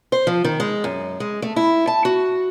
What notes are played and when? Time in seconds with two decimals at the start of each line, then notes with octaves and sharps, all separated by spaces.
0.12 C5
0.27 F3
0.44 D#3
0.60 G#3
0.84 F#2
1.20 G#3
1.42 A3
1.56 E4
1.87 A5
2.05 F#4